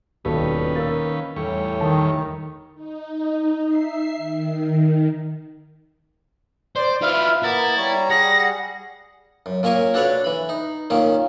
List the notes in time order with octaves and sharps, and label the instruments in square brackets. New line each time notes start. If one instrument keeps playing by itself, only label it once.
[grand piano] D#1 B2 A4 [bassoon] G2 [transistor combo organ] D#3 C#4 B4
[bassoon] A#3 [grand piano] E6 A6
[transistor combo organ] E2 G3 C#5 [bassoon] A2
[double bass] D#3 [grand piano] A5
[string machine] D#4
E5 C7
D#3
[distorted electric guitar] C5 [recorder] D5
[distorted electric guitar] E4 F4 [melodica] B4 E5 F5 [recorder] F6
[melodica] A#3 B3 A#5 [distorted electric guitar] E4 [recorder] A6
[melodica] G3 C#5 A#5
[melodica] G3 G#4 [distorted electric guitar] F#5 [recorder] A#6
[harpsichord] F#2
A#2 C#4 A#4 G#5 C#6
D4 F#4 A4 B4 C#5 D5
E3 B5
D#4
A#2 D#3 C#4